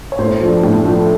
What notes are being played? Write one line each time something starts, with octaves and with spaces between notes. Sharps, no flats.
C#5
A2 C5
F3 A3 D4
A2
F3 A3 D4